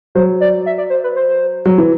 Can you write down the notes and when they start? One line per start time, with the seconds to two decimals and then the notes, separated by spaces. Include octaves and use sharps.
0.15 F#3 C5
0.41 D5
0.66 E5
0.78 D5
0.90 C5
1.04 B4
1.16 C5
1.66 F#3
1.78 E3